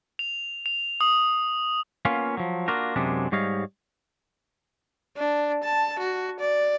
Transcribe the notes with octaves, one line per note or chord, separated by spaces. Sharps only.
F7
F7
D#6
A#3 B3 C#4 F4
F3 F#3
A#3 D4 F4 F#4 A#4
F#2 C3 F#3 G#3 D4
G#2 G3 C#5 D#5 F5
D4
A5
F#4
D5